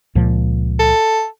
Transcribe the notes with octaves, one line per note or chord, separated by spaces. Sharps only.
C#2 A#2 F3
A4